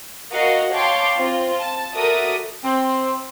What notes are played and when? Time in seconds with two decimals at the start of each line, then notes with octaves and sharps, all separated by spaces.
0.31 F#4 A#4 D#5 F5 F#5
0.72 C#5 F5 G5 A5 C6 D6
1.18 C4 F4
1.60 A5
1.94 F#4 A4 A#4 D5 E5 D#6
2.63 C4